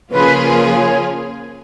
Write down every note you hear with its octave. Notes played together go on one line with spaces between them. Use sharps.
C#3 F3 A#3 F4 G#4 B4
C#5